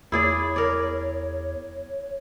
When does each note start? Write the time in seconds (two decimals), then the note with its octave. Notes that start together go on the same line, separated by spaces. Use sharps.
0.12 E2 E4 G#4 C#5 D5
0.56 A#4 D5